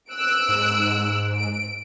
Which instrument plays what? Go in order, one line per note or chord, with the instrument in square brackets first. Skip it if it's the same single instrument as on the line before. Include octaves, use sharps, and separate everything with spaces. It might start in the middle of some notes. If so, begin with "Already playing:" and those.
[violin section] E6 F#6 D7
[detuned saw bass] G#2
[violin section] D7